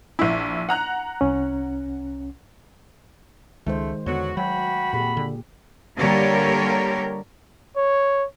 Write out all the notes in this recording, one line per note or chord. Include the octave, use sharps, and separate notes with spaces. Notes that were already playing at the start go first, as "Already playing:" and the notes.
A#1 E4
F#5 A#5 F#6
C2 C#4
C#2 D#3 G#3 A3 C5
E2 D3 F#3 B3 F#4
D2 F#3 F#4 G5 B5
F2 A#2 G4 G#4 B5
D3
D3 G3 A#3 G4 A#4 C#5
C#5